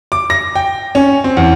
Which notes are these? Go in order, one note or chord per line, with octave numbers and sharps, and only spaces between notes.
D6
A#6
G5
C#4
C4
E2